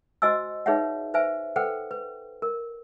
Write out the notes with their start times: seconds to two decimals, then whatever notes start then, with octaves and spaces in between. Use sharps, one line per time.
0.22 F#4 C5 D#5 G#5 E6
0.66 D#4 G#4 B4 C#5 E5 F#5
1.14 B4 C5 E5 G#5
1.56 A4 B4 C5 F#5 G5
1.91 B4
2.42 A#4